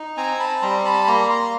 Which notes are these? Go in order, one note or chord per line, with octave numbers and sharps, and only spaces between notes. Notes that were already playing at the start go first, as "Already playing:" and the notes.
Already playing: D#4
C4 G#5 A#5
A5 B5
G3 A#5 C6
A5 B5
A#3 A#5 C6
A#5 C6